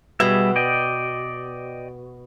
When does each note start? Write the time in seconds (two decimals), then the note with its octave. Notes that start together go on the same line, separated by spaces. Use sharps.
0.20 B2 G3 G#4 E5
0.56 D5 D#5 G5